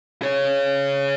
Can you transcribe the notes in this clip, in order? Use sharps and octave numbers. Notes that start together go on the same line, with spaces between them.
G#4 C#5